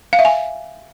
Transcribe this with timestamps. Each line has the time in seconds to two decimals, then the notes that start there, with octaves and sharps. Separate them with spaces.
0.13 F5
0.19 E5
0.25 G#5